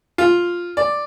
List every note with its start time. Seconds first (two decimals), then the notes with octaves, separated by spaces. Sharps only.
0.18 F4
0.77 D5